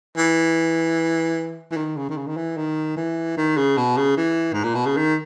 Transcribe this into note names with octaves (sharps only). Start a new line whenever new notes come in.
E3
E3
D#3
C#3
D#3
C#3
D#3
E3
D#3
E3
D#3
C#3
B2
C#3
E3
G#2
A#2
B2
C#3
D#3